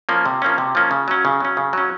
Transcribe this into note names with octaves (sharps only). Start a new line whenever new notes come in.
F3 A#3 C#4
C3
F3 A#3 C#4
C3
F3 A#3 C#4
C#3
F#3 C#4
C#3
F#3 C#4
C#3
F#3 C#4